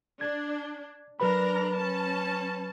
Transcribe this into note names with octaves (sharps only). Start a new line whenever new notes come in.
D4 G#6
F#3 D4 A#4 B4 A#5 B5
C#4 A5